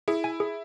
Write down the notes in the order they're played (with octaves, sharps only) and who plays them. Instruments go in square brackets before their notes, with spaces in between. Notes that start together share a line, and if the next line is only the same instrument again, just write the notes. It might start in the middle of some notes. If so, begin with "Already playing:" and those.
[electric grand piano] E4 [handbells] G#4
[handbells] G#5
G#4